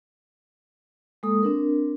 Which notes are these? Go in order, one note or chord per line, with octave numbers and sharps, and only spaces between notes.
G#3 A#3 A4 D#6
C4 D4 A#4